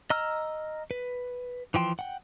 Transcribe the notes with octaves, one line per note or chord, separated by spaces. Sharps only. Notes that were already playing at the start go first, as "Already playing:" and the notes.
D#5 A#5 E6 F6
B4
E3 F3 G5 C6
F#5 G5